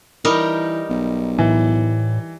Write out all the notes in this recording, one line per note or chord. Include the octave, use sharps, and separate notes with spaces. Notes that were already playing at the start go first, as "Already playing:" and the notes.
E3 G3 D#4 A#4
B1
A2 E3